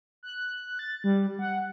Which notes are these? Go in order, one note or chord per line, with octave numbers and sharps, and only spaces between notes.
F#6
A6
G3
F#5